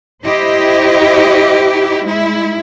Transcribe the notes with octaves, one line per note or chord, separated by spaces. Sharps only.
E4 G4 C5 D#5
G#3 E4